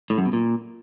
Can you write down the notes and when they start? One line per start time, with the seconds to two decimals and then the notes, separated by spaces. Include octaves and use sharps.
0.10 A2
0.18 F#2
0.25 B2
0.33 A#2